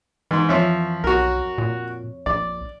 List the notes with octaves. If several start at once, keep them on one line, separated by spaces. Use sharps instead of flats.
G#2 E3 C6
F2 F3 C4 C#5 E5
B1 F#4 A#4
A#2
A#1 D5